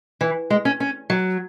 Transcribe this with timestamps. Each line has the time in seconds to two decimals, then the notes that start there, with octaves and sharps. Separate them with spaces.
0.21 E3
0.50 G#3
0.65 C#4
0.80 C#4
1.10 F#3